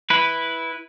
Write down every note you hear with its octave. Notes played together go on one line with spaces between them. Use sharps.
E4 B4